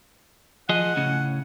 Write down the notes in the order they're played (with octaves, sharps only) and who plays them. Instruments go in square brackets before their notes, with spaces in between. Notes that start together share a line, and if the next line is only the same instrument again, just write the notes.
[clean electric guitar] F3 G#4 D#5 [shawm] F#5
[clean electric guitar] A2 C#3 C#4